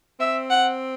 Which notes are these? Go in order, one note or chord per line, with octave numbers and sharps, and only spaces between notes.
C4 E5
F#5